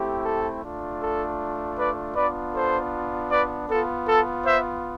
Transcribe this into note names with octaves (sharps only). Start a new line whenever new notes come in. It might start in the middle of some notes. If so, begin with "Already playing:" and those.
Already playing: A3 C4 E4 G4
A4
A3 D4 F4
A4
B4 D5
B3 D4 F4 B4 D5
A4 C5
B4 D5
B3 F4 A4
A4
C5 E5